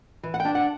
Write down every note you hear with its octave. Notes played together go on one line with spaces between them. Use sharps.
E3
F#5
G5
D4
F#5